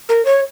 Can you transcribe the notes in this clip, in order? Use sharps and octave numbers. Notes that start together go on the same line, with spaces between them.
A#4
C#5